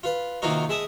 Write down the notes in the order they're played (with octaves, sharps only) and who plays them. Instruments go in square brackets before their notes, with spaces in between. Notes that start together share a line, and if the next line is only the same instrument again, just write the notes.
[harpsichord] F4 B4
C3 D#3 A#3 D#4 F4 F#4
G#3 E5 A5 D#6